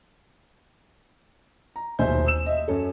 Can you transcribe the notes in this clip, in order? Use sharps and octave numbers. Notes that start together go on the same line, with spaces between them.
A#5
D#1 B1 C5 E5 G#5 G6
E6 E7
D#5 E5
F#2 C#4 A4